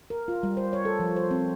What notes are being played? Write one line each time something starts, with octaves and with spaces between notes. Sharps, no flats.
A#4
F4
G3
C5
C#5
A4
F3
C5
C4